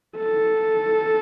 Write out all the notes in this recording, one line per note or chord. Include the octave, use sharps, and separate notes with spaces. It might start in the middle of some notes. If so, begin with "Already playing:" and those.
A4